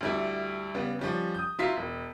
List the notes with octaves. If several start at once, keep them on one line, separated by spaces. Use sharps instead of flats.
D2 G3 E4
C#3 G3 B3
F3 G3 C#4
D#6 G6
F#3 E4 F4 B6
E1